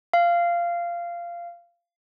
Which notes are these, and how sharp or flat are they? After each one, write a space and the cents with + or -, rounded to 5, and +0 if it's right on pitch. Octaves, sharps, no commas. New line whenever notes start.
F5 -15